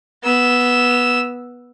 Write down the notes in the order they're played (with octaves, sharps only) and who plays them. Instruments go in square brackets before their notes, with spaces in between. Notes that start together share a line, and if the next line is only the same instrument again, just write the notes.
[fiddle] B3 E6